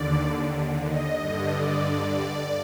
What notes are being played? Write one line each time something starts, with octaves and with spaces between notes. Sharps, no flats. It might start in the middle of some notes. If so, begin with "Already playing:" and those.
Already playing: D#2 D3 D5
D#5
G2 D3
D5